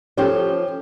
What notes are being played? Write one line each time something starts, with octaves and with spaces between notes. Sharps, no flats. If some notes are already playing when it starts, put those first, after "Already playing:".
F3 C#4 F4 G4 A4